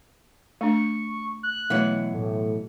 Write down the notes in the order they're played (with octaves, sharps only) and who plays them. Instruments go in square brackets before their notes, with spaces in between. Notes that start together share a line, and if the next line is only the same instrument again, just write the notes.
[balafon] A3 D4 [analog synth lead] C#6
[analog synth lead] F#6
[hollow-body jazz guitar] B2 E3 F#3 [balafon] A3
[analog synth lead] A2